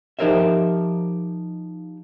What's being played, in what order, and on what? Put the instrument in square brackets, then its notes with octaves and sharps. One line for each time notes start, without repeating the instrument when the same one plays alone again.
[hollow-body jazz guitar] F3 D#4 G4 A#4 C5 E5